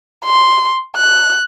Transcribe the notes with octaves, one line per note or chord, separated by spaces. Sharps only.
C6
F#6